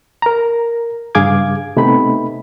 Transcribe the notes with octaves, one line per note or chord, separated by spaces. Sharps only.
A#4 A#5
G2 C#3 G#4 F5 D6 G#6
C3 A3 B3 C4 D#4 B5